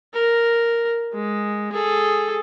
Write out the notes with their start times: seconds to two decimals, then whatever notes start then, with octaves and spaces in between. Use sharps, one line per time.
0.14 A#4
1.13 G#3
1.72 G#4 A4